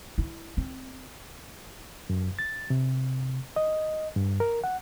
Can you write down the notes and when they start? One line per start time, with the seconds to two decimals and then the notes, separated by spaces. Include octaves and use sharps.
0.18 E4
0.57 C4
2.10 F#2
2.39 A6
2.70 C3
3.56 D#5
4.16 G2
4.40 A#4
4.64 F#5